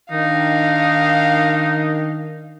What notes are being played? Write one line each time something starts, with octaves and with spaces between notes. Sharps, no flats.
D#3 D4 D#4 F5